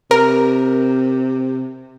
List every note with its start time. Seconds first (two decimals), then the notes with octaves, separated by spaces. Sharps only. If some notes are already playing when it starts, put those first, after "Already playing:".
0.11 C3 A#4